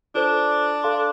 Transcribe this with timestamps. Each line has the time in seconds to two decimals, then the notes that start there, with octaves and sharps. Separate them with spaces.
0.15 D4 F4 A4 C5
0.84 A4 F5 C6